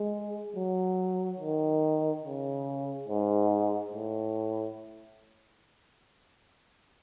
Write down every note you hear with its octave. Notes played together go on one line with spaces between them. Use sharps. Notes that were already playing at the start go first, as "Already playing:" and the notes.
Already playing: G#3
F#3
D#3
C#3
G#2
A2